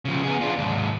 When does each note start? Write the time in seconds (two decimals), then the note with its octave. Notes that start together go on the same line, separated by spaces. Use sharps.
0.05 C#3 F3
0.23 B3 G#4
0.41 D4 F4
0.58 D#2 G#2